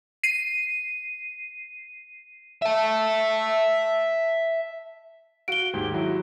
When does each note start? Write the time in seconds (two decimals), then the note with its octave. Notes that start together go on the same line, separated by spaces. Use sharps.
0.23 C7 D#7
2.62 E5 A5
5.48 F#4 F5 D7 G7
5.74 D#2 G#2 G4
5.94 F#3 E4 F#4